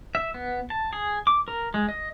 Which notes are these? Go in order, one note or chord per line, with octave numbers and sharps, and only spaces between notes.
E5
B3
A5
G#4
D6
A#4
G#3
D#5